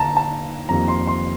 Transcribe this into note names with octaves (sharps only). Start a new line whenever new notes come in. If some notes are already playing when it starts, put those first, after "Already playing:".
Already playing: D#2 D3 A5 A#5
A5
F2 D#3 G3 A#3 A#5
C6
C6